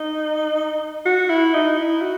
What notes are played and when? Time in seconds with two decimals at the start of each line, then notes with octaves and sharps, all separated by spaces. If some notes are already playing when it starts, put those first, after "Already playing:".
Already playing: D#4
1.06 F#4
1.30 E4
1.54 D#4
1.78 E4
2.01 F#4